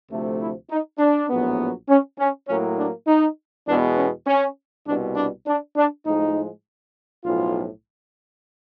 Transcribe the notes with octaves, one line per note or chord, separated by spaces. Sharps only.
D2 C3 F3 A3
E4
D#4
D4
A#1 A2 F#3 B3
C#4
C#4
A2 F#3 A#3 C#4
D4
D#4
E2 B2 G#3 B3 D4
C#4
C#4
C2 B2 G3 D4
D4
D4
D4
A2 F3 G#3 D#4
B1 A2 F3 F4